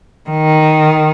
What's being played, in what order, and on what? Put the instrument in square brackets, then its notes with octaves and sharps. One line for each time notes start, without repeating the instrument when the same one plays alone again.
[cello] D#3